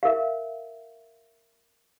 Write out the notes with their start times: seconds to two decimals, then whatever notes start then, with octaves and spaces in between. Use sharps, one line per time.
0.03 A#4 E5 F5